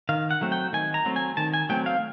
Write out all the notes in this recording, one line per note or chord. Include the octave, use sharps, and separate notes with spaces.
D#3 F5
F#5
F#3 A3 C4
G5
D#3 G#5
A#5
F#3 A3 C4
G#5
D#3 A5
G#5
F#3 A3 C4 G5
F5